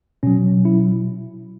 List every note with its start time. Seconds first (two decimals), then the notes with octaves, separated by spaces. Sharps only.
0.23 B2 F#3 C#4
0.65 E4